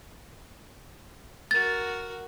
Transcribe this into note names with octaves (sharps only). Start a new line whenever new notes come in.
F#4 A#4 A6